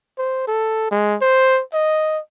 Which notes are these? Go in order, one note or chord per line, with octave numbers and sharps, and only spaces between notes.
C5
A4
G#3
C5
D#5